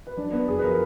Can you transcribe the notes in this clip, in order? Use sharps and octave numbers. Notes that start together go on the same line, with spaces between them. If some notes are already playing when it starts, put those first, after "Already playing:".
B4
F#3 D4 D5
B3 B4
F#2 G#4
B4
F3 A#4